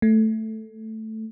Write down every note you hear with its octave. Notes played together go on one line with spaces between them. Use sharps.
A3